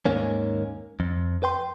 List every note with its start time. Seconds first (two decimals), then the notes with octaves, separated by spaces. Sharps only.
0.05 D#2 G#2 D#3 A#3 C#4
1.00 F2
1.43 B4 G5 C6